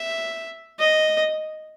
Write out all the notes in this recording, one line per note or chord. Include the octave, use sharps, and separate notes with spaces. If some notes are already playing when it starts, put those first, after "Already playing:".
Already playing: E5
D#5